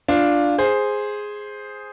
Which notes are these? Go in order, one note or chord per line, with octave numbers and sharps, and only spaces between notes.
D4 F4
G#4 C5